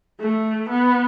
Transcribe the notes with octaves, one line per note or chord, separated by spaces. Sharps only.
A3
B3